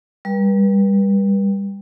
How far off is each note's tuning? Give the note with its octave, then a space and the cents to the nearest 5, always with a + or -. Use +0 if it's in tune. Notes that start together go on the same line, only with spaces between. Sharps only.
G3 +20 B4 -35